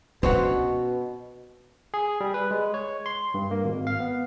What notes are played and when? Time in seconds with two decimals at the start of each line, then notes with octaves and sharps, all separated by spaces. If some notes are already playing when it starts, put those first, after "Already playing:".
0.23 B2 C#4 D4 C5 C#5 F#5
1.94 G#4
2.21 G3
2.34 B4
2.51 G#3
2.74 C#5
3.06 C6
3.34 G2
3.51 A#3
3.64 G#1
3.87 F5
4.00 B3